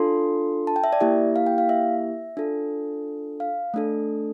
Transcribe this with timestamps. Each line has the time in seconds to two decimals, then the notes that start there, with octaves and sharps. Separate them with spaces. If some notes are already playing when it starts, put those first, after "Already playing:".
Already playing: D4 F4 A4 C6
0.67 A5
0.76 G5
0.84 E5
0.93 D5
1.01 A#3 E4 G4 E5
1.36 F5
1.47 G5
1.58 F5
1.69 E5
2.37 D4 F4 A4
3.40 F5
3.74 A3 D4 A4